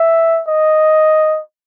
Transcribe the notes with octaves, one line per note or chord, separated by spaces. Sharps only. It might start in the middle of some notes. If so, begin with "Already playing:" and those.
Already playing: E5
D#5